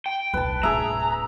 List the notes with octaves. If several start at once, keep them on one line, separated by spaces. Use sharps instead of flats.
G5
D#1 C2 B4 A5
D1 D4 G#4 E5 A#5